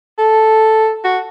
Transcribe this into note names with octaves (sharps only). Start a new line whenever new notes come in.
A4
F#4